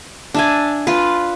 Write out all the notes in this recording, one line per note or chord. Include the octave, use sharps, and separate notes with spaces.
D4 E5 G#5
F4 B4